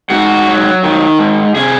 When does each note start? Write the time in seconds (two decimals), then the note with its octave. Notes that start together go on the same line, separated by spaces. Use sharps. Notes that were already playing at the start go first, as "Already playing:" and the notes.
0.10 G#2 F#4
0.46 F#3
0.83 D#3
1.18 G#2
1.55 C3 G#4